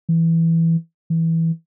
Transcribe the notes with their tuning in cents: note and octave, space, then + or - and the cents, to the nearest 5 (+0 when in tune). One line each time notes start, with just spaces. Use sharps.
E3 +0
E3 -10